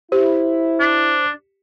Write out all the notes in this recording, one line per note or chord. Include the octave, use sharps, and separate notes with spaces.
E4 G4 C5
D4